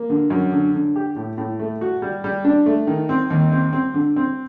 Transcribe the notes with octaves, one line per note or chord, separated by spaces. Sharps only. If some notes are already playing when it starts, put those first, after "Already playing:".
Already playing: A#3
D3
F#2
D3
D3
G4
A2
A2
A3
F#4
G3
G3
D4
A3
D#3
C4
D#2
C4
C4
D3
C4